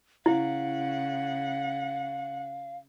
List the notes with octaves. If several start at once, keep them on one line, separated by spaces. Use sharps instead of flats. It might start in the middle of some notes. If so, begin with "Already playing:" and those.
C#3 E4 F5 F#5